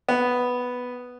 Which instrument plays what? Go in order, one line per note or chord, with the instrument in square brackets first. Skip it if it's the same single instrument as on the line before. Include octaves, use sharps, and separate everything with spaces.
[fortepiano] B3